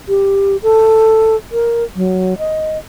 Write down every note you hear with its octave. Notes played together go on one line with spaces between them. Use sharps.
G4
A4
A#4
F#3
D#5